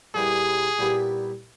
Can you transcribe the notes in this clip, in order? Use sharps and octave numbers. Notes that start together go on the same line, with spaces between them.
A#2 G3 B3 E4 G#4
A#2 G3 B3 E4